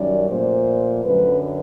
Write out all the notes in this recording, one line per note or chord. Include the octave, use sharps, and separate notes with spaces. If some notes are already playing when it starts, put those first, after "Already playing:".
Already playing: F#2 D#3 G3 D5
A#2 F3 A3 C5
F#2 D3 F#3 B4